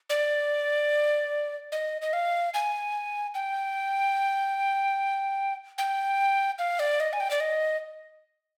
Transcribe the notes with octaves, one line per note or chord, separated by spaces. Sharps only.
D5
D#5
D#5
F5
G#5
G5
G5
F5
D5
D#5
G#5
G5
D5
D#5